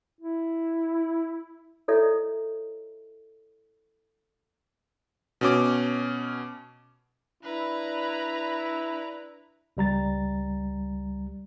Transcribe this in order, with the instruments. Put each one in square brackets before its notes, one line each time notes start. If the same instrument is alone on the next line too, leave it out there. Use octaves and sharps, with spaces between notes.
[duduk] E4
[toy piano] E4 A4 C#5 D#5 E5
[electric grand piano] B2 C#4 D6
[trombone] D4 [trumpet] E4 [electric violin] B4 A#5
[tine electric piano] C#2 G3 A#5 A6